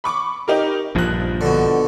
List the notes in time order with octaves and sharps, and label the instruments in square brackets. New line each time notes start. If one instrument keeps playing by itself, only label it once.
[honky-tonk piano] B5 C#6 D6
D#4 G4 A#4
[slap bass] A#1 G2 [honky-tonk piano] F3 F#6
[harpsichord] B2 D3